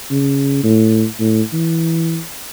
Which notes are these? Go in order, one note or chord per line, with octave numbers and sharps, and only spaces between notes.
C#3
A2
A2
E3